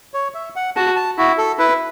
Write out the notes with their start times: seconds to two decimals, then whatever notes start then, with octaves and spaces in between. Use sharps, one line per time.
0.14 C#5
0.34 E5
0.56 F#5
0.76 F#4 A5
0.96 A5
1.18 E4 F#4
1.38 A4
1.58 E4 B4